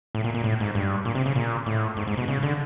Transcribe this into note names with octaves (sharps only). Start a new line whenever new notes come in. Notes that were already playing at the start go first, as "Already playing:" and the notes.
A2
A#2
A#2
A2
G#2
G2
A#2
C3
C#3
A#2
A2
G#2
G#2
B2
C#3
D3